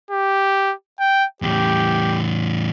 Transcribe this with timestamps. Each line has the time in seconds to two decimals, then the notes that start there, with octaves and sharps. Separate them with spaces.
0.11 G4
1.00 G5
1.42 E2 A2 G4